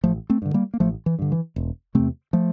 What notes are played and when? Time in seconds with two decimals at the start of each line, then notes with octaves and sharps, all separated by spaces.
0.04 A1 F3 A3
0.30 A3 C4
0.42 G2 D3
0.54 G3 A#3
0.74 A#3
0.80 A1 F3 A3
1.06 E3
1.19 G2 D3
1.32 E3
1.56 E1
1.95 E2 C3 A3 C4
2.33 F3 A3